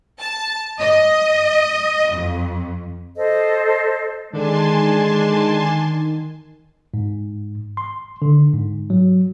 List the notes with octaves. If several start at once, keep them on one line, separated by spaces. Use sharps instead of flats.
A5
D#5
F2
A4 C5 D#5
D3 D#3 G#3 D4 G#5 A5 C6
G#2
C6
D3
G#2
F#3